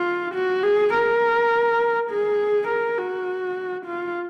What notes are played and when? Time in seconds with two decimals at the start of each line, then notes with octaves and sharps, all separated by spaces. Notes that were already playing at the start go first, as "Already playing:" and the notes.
Already playing: F4
0.35 F#4
0.63 G#4
0.94 A#4
2.11 G#4
2.69 A#4
2.98 F#4
3.86 F4